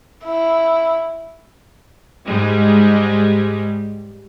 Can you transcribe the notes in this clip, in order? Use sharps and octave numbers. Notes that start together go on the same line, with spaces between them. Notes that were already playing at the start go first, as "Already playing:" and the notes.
E4
G#2 G3 G#3